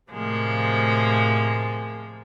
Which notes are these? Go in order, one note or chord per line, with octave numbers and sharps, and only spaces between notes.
A2 C3 F3 G#3 A#3